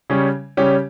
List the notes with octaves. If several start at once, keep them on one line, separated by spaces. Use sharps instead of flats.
C#3 G3 C#4 G4 C#5
C#3 G3 C#4 G4 C#5